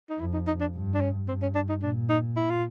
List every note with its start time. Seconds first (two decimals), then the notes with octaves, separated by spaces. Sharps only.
0.10 D#4
0.19 F2 E4
0.33 D#4
0.47 D#4
0.61 D4
0.75 G2
0.95 D4
1.01 C#4
1.28 G2 C4
1.42 C#4
1.55 D4
1.69 D#4
1.82 A#2 D4
2.10 D#4
2.37 E4
2.50 F4